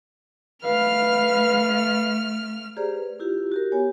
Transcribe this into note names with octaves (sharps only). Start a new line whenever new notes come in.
A3 B4 F5 F6
G4 G#4 C5 D5 A#5
B4
E4 F4 G4
F#4 G4 A#4
B3 G4 C#5 G#5